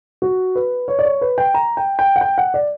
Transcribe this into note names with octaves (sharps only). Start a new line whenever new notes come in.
F#4
B4
C#5
D5
C#5
B4
G5
A#5
G5
G5
F#5
G5
F#5
D5